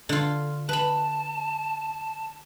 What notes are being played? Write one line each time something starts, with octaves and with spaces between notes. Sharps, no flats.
D3 F4
B4 A5 B5